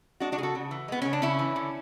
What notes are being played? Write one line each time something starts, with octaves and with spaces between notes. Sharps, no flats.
G#3 D4 F#4
D4 F#4
C#3 G#4
F#4 A4
C#3
E3
G#3 B3
C#3 C#4
D4
C#3 C#4 E4
E3
D3